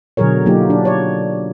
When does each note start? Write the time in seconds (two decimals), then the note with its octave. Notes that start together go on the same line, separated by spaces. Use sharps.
0.17 B2 D3 F#3 G#4 A#4 C#5
0.46 F#3 A#3 D#4 F4 G4
0.70 D4
0.85 C#5 D5